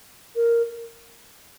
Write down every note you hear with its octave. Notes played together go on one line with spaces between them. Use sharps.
A#4